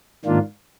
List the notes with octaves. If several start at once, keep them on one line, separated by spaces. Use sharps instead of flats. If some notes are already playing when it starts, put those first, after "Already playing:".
G#2 D#3 A#3 D4 F4